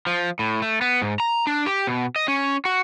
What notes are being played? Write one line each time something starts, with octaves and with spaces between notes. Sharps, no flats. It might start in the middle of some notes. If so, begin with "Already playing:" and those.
F3
A2
A3
B3
G#2
A#5
D4
G4
B2
D#5
C#4
F#4